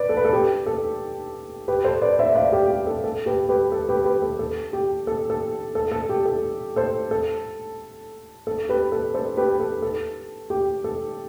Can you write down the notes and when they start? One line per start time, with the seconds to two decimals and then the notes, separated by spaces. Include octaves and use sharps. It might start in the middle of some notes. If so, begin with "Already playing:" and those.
Already playing: B4 D5
0.09 A4
0.17 B4
0.25 A4
0.33 G4
0.66 A4
1.68 G4 B4
1.84 A4 C5
2.02 B4 D5
2.19 C5 E5
2.35 D5 F5
2.52 G4
2.70 G4
2.87 A4
3.04 A4
3.26 G4 B4
3.49 G4 B4
3.72 A4
3.89 G4 B4
4.05 G4 B4
4.22 A4
4.39 A4
4.73 G4
5.07 A4
5.30 A4
5.75 A4
5.92 A4
6.09 G4
6.25 A4
6.76 A4 C5
7.11 A4
8.47 A4
8.69 G4 B4
8.92 A4
9.14 A4 C5
9.37 G4 B4
9.60 A4
9.82 A4
10.50 G4
10.84 A4